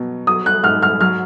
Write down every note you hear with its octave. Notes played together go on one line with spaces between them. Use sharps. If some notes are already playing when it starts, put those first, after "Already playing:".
Already playing: B2 F#3
F#3 D#6
F#6
G#2 F6
F6
F#3 F6